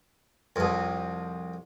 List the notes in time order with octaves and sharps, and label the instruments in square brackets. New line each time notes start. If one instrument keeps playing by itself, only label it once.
[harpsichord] C2 F2